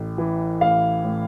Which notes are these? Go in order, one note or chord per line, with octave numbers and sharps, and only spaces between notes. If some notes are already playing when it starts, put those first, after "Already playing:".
Already playing: A1
E3
A1 F5
A2